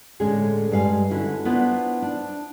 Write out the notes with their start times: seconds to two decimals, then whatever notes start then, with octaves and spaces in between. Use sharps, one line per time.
0.20 A2 D3 G#3 C#4 G#4
0.71 G2 G3 G#3 F5 G#5
1.10 D3 C#4 E4 F#4
1.45 B3 D4 E4 F4 A#4 C5
2.02 D4